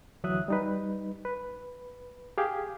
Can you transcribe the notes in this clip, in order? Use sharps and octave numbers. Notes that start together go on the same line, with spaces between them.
D2 E3 F#3 E5 D#6 F#6
G3 D#4 B4
B4
G4 G#4 F5